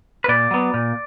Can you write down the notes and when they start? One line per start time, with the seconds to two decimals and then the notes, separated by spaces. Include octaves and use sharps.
0.24 B4
0.28 A#2 D5
0.51 F#3 B3
0.74 A#2